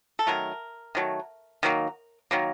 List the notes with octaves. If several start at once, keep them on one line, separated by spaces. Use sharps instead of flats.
A4
D#3 F#3 A3 A#4
D#3 F#3 A3
D#3 F#3 A#3
D#3 F#3 A#3